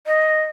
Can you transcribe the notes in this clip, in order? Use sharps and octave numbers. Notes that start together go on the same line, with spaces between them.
D#5